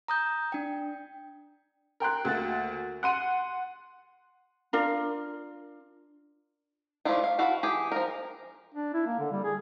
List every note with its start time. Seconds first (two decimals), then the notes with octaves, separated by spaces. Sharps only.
0.08 A#5 D#6 G6
0.52 D4 G5
2.00 A#4 G5 C6 F#6
2.25 D2 A#3 A6
3.03 F#5 C6 D#7
4.73 D4 F4 A#4
7.05 F3 A3 D4 E4 F4
7.24 F5
7.39 E4 F#4 A4 F5
7.63 E3 G4 G#4
7.92 F3 A#4
8.74 D4
8.94 E4
9.06 A#3
9.19 D3
9.32 G3
9.44 G#4